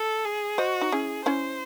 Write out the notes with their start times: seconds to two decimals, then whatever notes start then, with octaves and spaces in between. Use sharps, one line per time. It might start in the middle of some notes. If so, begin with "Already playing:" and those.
Already playing: A4
0.25 G#4
0.58 F#4 C5 D#5
0.81 D#4
0.92 C#4 E4 G#4
1.26 C#4 E4 C5